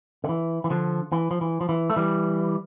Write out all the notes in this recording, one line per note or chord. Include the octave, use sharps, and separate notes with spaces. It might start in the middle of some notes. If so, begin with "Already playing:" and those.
D3
E3
E3
D3 F3
E3
F3
E3
F3
E3
A3
E3 G3